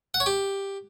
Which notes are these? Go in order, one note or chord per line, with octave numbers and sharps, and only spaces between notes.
F#5
C#5
G4